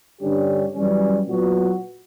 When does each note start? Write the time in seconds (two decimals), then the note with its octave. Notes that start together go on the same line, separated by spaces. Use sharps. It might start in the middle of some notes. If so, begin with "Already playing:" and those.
0.21 G2 D3 G3 C#4 G4
0.74 F#2 E3 G3 C#4
1.27 A#2 F#3 B3 F#4